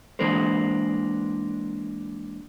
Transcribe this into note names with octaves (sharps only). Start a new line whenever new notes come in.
E3 G#3 A#3 D4 A#4 C5